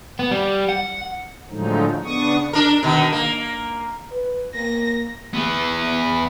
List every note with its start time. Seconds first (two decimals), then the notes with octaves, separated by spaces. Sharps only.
0.19 B3
0.31 G3
0.69 F#5
1.50 A2 D3 F3 F#3 G#3 D#4
2.04 C#3 B3 D4 C#6 D#6
2.53 D4 A#4
2.83 B2 D#3
3.12 A#3
4.11 B4
4.55 A#3 A#6
5.34 E3 B3